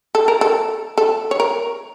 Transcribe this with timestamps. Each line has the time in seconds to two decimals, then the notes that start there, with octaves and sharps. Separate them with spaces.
0.15 A4
0.28 A#4
0.41 A4
0.98 A4
1.31 C#5
1.40 A#4